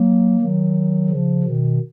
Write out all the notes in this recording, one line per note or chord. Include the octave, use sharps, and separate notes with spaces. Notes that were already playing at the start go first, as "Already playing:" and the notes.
Already playing: F#3 A#3
D#3 F#3
C#3 F3
B2 D#3